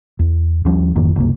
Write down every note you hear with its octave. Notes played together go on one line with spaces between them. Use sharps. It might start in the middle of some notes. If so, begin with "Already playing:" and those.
E2
D#2 F3 G3 C#4
G#1 F2 D#3 A#3
F#1 C2 A#3